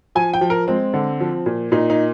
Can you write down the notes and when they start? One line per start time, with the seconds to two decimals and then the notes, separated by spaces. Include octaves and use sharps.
0.15 F3 G#5
0.34 G5
0.41 F3
0.50 A#4
0.67 G#3 C4
0.94 D3
1.20 F3
1.46 A#2
1.72 A#2 D#4
1.90 D#4